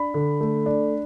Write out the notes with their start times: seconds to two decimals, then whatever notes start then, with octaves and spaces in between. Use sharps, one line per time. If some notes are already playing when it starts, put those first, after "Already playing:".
Already playing: D4 B5
0.14 D3
0.41 A3
0.66 D4